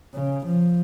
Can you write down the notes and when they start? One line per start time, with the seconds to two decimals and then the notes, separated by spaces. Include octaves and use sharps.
0.14 C#3
0.47 F3